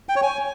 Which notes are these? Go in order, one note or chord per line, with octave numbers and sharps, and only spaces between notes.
G5
C#5
G#5